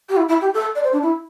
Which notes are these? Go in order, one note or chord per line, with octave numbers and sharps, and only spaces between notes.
G4
E4
E4
G4
A4
D5
C5
D4
E4